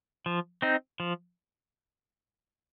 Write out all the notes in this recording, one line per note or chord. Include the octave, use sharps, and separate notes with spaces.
F3
C4 D#4
F3